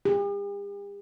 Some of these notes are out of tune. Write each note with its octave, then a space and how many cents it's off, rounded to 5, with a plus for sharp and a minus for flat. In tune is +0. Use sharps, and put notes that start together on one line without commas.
G4 +45